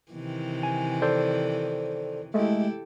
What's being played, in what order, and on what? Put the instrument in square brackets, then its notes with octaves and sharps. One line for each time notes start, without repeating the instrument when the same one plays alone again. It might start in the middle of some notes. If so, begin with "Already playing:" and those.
[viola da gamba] C3 D#3 E3
[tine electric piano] G#5
A4 C5 D5
[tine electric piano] G#3 A3 [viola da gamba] E4 G4 A4